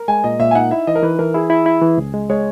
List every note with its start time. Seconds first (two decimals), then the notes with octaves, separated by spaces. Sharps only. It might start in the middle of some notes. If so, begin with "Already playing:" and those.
Already playing: A#4
0.08 G#3 G#5
0.24 A#2 D#5
0.40 A#2 E5
0.51 G#5
0.55 D#4 F#5
0.71 E4 E5
0.87 E3 D#5
0.95 A#4
1.03 E3 B4
1.19 E3 A#4
1.34 E4 G#4
1.50 E4
1.66 E4
1.82 E3
1.98 C#2
2.14 G#3
2.29 G#3 C#5